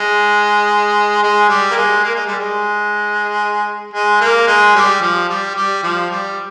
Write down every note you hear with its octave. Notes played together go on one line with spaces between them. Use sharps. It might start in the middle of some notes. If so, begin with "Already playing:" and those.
Already playing: G#3
G#3
G3
A#3
G#3
A#3
G#3
G3
G#3
G#3
A#3
G#3
G3
F3
G3
G3
F3
G3